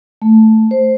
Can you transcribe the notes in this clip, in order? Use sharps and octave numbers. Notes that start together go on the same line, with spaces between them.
A3
C5